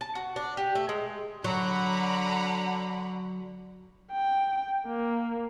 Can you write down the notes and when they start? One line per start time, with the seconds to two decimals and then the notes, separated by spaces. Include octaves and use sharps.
0.01 A5
0.15 F#4
0.36 D4
0.57 G4
0.75 A3
0.89 G#3
1.44 D3 F#3 F#5 A#5 B5
4.12 G5
4.87 A#3